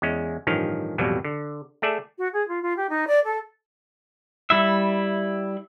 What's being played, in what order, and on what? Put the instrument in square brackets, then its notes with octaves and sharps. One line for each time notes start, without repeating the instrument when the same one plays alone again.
[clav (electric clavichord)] E2 G#3 C#4
A1 G2 D#3 F3 C#4 F5
A1 F2 B2 F#3 G3
D3
A3 G#4 A4 D5 E5
[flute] F#4
G#4
F4
F4
G4
D#4
D5
A4
[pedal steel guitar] G3 E4 E5